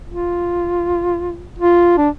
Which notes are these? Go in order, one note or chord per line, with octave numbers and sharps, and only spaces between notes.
F4
F4
D4